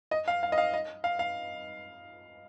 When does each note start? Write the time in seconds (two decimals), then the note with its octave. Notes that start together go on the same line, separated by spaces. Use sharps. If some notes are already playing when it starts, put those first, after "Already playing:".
0.11 D#5
0.28 F5
0.43 F5
0.52 D#5
0.58 F5
0.74 D#5
1.04 F5
1.19 F5